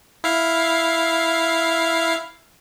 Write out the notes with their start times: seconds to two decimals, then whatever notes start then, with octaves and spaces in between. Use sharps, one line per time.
0.24 E4 F5